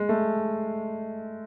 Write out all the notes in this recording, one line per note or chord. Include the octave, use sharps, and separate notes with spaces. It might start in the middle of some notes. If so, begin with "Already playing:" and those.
Already playing: G#3
A3